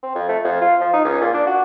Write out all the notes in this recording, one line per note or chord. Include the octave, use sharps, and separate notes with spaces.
C4
F2
A3
F2
F4
F3
D#4
C#2
A#2
D4
F#4